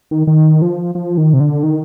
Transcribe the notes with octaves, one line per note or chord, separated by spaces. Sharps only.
D#3
D#3
F3
F3
D#3
C3
D3
D#3